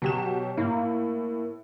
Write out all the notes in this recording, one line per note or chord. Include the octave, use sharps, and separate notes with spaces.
B2 F#3 G4 E7
A2 A#3